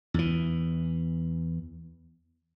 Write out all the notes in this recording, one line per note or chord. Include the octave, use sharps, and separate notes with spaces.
E2 E3